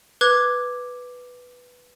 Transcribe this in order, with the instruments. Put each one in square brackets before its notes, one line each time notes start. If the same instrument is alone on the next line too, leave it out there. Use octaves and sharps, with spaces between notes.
[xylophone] B4 D6 F#6 G#6